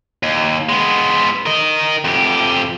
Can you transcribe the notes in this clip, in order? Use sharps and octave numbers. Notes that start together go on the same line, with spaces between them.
D#2
G#3 B3
A#4 D#5
F2 G4